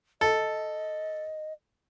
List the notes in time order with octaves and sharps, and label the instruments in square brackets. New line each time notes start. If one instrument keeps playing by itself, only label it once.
[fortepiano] A4 [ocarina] D#5